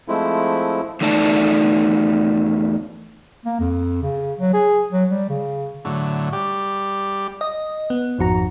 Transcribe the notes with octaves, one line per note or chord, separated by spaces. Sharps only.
F3 G#3 A3 C4 E4
E2 A3 D#4 D5 A5
A#3
F2
C#3
F#3
G#4
F#3
G3
C#3
A2 D3 F#3
G3 G4
D#5
B3
G#1 F2 F#4 A#5